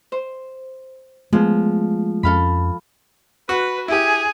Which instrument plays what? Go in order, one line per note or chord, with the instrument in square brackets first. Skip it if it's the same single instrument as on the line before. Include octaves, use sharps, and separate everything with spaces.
[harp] C5
[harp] F3 G#3 [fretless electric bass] A3 B3
[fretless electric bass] F2 C#4 [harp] A4 F5 B5
[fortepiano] F#4 [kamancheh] B4
[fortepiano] E4 G4 [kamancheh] G#4